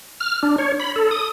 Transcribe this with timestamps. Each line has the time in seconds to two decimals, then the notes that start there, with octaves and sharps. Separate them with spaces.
0.20 F6
0.43 D4
0.58 C#5
0.80 B5
0.96 A4
1.11 D#6